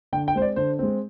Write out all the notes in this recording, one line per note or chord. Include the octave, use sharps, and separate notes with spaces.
D3 G5
G5
G#3 C4 C5
D5
D3 C5
G#3 C4